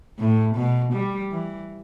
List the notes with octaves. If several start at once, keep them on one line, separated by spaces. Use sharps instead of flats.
A2
B2
G3
E3